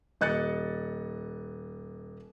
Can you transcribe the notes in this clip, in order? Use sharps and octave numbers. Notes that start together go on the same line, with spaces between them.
D#1 D#5 F#6 A6 C#7